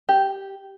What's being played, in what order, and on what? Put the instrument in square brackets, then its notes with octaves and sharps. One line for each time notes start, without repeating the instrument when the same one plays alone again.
[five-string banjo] G4